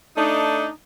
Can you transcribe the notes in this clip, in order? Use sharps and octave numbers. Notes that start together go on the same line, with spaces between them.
A3 D4 D#4